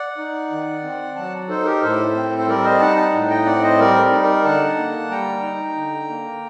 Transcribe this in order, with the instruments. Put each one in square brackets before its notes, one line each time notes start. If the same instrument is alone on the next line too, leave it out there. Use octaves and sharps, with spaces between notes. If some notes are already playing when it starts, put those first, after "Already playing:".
Already playing: [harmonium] D5 F#5
D#4
D#3
C4
F#3 F#5 A5
D#4 A4 C5
G4 A#4
A2 A4 C5
C4
C5
G3 A#4 D5
C5 D#5
D#4 F#5 A5
F#5 A5
A2
D#5 G5
C4 D5 F#5
C5 D#5
G3 A#4 D5
D#4
A#4 D5
D3 F#5 A5
A#3
G3 G5 A#5
D#4
D3
A#3